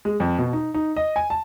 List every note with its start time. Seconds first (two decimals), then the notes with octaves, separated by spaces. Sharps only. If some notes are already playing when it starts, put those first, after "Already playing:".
0.05 G#3
0.20 F2
0.38 B2
0.53 D#4
0.74 D#4
0.97 D#5
1.16 G#5
1.30 A5